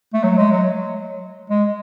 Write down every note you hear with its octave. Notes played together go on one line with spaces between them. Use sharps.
A3
F#3
G#3
F#3
G#3